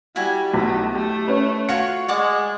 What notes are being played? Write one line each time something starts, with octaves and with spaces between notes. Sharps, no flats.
G3 E4 F#4 G#5
B1 A3
A3 G4
C#4 B4
F4 F#4 C#5 C#7
G#3 D5 F#5 D6